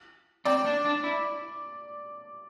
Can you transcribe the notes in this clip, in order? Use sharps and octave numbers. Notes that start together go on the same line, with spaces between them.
C4 D5
D4
D4
E4